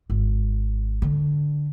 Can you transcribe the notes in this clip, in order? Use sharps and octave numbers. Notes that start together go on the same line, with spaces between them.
G#1
D3